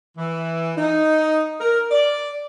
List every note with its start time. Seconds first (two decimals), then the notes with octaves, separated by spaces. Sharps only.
0.18 E3
0.78 D#4
1.61 A#4
1.91 D5